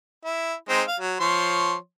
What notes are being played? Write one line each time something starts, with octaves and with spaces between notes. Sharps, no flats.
E4
G#3 C4 D#4
F5
F#3
F3 C#5 C6